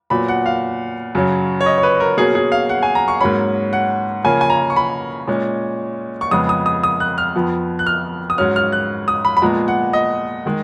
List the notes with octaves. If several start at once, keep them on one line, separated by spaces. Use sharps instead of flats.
A#2 F#3 B3 B5
F#5
F5
F#2 C#3 F#3 C#4
C#5
D#5
C#5
B4
A#4
B2 F#3 A#3 C#4 G#4
G#4
F5
F#5
G#5
A#5
C#6
G#2 F#3 A#3 C#4 B5
F#5
C#3 F3 A#3 C#4 G#5
G#5
A#5
C#6
B5
A#2 G#3 C#4
C#6
F2 C#3 G#3 B3 D#6
D#6
D#6
D#6
F#6
F6
F2 F3 B3
F#6
F6
D#6
G#2 F#3 C#4 F6
F6
F#6
D#6
B5
B5
A#2 F3 G#3 B3 A#5
F#5
D#5
D#3 G#3